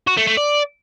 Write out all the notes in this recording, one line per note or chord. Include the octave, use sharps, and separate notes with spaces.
F#4
A3
A3
D5